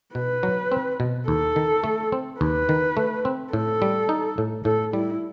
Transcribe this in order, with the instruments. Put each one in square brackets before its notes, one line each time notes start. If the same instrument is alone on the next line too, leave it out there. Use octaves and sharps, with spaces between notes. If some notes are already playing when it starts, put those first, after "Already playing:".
[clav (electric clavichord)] B2 [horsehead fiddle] B4
[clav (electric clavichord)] F#3
C4
B2
[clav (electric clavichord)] D#2 [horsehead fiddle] A4
[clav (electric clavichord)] D#3
A3
C4
[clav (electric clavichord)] D#2 [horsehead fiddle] B4
[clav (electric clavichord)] D#3
A3
C4
[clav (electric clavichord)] A2 [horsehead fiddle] A4
[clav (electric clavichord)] G3
D#4
A2
[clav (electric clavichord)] A2 [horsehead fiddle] A4
[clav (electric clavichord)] G3 [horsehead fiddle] E4